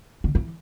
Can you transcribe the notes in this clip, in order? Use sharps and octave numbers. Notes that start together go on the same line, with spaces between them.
D3
E3